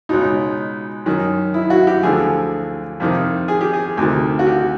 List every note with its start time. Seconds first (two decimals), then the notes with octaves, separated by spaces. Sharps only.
0.09 C#2 B2 D#4
1.06 F#2 D#3
1.54 E4
1.70 F#4
1.87 G4
2.03 D2 D3 F3 G#4
3.00 F2 C3 D#3
3.48 G#4
3.61 G4
3.73 G#4
3.97 D2 C3 D#3
4.39 F#4
4.47 G4